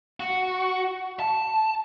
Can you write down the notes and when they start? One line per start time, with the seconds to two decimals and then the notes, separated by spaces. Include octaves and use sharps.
0.20 F#4
1.20 A5